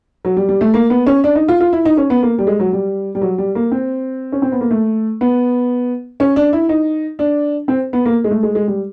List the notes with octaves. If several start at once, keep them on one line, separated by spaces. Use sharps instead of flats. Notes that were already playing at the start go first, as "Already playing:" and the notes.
F#3
G3
G3
A3
A#3
B3
C#4
D4
D#4
F4
F4
E4
D#4
C#4
B3
A#3
G3
G#3
F#3
G3
G3
F#3
G3
A#3
C4
C#4
C4
B3
A#3
A3
B3
C#4
D4
E4
D#4
D4
C4
B3
A#3
G#3
A3
G#3
G#3
G3